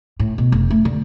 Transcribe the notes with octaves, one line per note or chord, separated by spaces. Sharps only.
A2
B2
F1
A3
D3